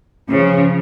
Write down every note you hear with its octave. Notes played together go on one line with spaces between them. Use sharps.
C#3 F3